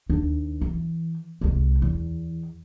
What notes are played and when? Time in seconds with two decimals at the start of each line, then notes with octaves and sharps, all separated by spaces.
0.09 D#2 D4
0.61 E3
1.41 C2 G#3
1.82 E2